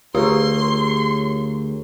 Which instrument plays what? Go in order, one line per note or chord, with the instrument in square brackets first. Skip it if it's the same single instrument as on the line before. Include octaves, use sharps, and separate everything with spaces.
[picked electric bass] D2 [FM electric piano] F4 A#4 C#5 [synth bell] G4 G#4 [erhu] C6